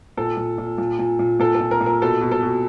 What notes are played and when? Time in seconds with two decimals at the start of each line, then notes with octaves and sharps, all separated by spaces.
0.17 A#2 A4
0.37 A#2
0.58 A#2
0.78 A#2
0.99 A#2
1.19 A#2
1.39 A#2 A4
1.55 A4
1.60 A#2
1.71 A#4
1.81 A#2
1.86 A#4
2.01 B2 A4
2.21 B2
2.32 A4
2.43 B2